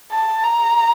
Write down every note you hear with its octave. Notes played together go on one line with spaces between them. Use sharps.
A5
A#5